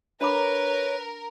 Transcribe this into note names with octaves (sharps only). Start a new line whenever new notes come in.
D4 A#4 B4 C#5 B5 D6